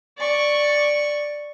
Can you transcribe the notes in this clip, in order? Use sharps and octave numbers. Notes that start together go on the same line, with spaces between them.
D5 C#6